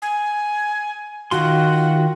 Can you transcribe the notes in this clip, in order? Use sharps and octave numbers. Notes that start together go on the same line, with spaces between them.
G#5
D#3 F4 F#4 C6